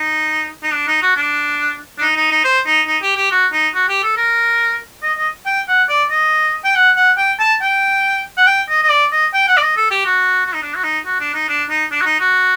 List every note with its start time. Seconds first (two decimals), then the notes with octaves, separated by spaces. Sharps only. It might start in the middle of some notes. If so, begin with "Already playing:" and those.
Already playing: D#4
0.63 D#4
0.73 D4
0.87 D#4
1.02 F#4
1.16 D4
1.98 D4
2.01 D#4
2.16 D#4
2.31 D#4
2.45 C5
2.66 D#4
2.87 D#4
3.03 G4
3.17 G4
3.31 F#4
3.53 D#4
3.75 F#4
3.89 G4
4.03 A4
4.17 A#4
5.03 D#5
5.18 D#5
5.46 G5
5.68 F#5
5.89 D5
6.10 D#5
6.64 G5
6.75 F#5
6.96 F#5
7.18 G5
7.40 A5
7.62 G5
8.37 F#5
8.47 G5
8.69 D#5
8.83 D#5
8.90 D5
9.12 D#5
9.34 G5
9.48 F#5
9.57 D5
9.62 D#5
9.77 A4
9.91 G4
10.05 F#4
10.46 F#4
10.54 D#4
10.62 D4
10.76 F#4
10.84 D#4
11.06 F#4
11.20 D4
11.34 D#4
11.49 D4
11.70 D#4
11.92 D4
12.01 F#4
12.06 D#4
12.20 F#4